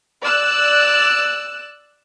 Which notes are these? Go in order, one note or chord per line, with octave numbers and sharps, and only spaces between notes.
D5 E6 F#6